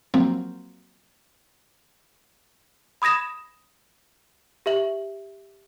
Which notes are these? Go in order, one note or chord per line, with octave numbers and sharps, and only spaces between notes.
F3 F#3 A#3 C4
B5 D#6 G#6 A#6 E7
G4 E5 F#7